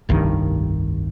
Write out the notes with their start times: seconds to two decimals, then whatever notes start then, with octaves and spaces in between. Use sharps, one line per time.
0.09 F1 C2 G2 D#3